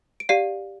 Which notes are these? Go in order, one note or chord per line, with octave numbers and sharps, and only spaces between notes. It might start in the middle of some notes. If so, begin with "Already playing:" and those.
D7
G4 D5 F5 C7